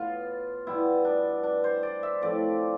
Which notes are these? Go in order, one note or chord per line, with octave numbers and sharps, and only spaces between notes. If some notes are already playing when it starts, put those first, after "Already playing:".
Already playing: A2 B3 F4
B2 G3 B3 E4
D4
D4
C5
D5
E5
A2 F3 A3 C4 D5